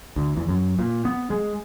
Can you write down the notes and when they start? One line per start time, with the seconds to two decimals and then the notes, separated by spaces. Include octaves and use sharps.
0.16 D2
0.37 E2
0.49 F#2
0.79 A#2
1.05 B3
1.30 G#3